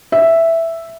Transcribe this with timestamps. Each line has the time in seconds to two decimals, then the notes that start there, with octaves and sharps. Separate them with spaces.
0.12 E5